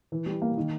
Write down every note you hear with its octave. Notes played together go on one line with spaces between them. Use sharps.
E3
G3
A#3
D#3